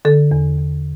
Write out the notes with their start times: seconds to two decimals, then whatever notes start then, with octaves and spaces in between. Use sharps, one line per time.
0.05 D3 A4
0.31 E2
0.58 E2